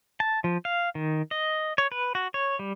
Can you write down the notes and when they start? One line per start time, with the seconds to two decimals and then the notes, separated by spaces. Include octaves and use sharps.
0.20 A5
0.44 F3
0.65 F5
0.95 D#3
1.31 D#5
1.78 C#5
1.92 B4
2.15 F#4
2.34 C#5
2.59 G3